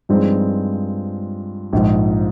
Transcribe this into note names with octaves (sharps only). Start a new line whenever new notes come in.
G2 F3 G#3 C4 D#4
A#1 G#2 F3